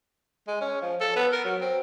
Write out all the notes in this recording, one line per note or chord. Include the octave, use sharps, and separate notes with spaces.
G#3
C#4
F3
A4
B3
A#4
F#3
C4